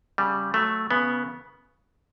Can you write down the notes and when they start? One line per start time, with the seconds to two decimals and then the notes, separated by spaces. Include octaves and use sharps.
0.18 C#3 G3
0.54 F#3 A3
0.91 C#3 B3